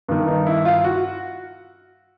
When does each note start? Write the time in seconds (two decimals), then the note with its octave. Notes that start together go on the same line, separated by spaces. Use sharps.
0.08 G2 D#3 B3
0.27 D#4
0.47 E4
0.65 F4
0.84 F#4